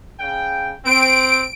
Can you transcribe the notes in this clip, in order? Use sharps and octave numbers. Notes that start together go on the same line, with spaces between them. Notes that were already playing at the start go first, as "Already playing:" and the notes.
C#3 G5
C4 D7